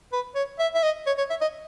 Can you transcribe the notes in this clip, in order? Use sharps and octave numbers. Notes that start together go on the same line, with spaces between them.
B4
C#5
E5
E5
D#5
C#5
C#5
E5
D#5